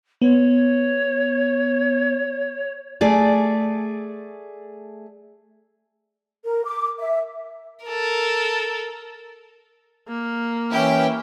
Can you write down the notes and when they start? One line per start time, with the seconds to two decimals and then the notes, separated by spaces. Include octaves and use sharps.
0.22 B3 C#5
3.01 A3 G#4 D5
6.44 A#4
6.65 D6
6.98 E5
7.85 A4 A#4
10.08 A#3
10.72 E3 C#4 E4 G4 G5